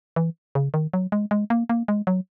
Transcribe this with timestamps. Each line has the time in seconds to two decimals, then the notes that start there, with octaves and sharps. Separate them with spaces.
0.16 E3
0.55 C#3
0.74 D#3
0.93 F#3
1.12 G#3
1.31 G#3
1.50 A#3
1.69 A#3
1.88 G#3
2.07 F#3